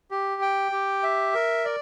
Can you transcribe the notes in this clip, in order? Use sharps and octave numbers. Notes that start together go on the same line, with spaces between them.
G4
G5
G4
E5
A#4
D5